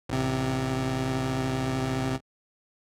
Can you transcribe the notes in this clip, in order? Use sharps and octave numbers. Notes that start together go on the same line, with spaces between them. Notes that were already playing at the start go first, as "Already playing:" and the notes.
A1 C3